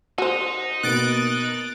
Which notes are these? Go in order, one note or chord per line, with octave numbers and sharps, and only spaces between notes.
D#4 F#4 C5
B2 A#3 B3 F#6 A6 D7